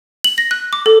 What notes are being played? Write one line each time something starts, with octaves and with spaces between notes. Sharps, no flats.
F#7
A#6
F#6
D6
A4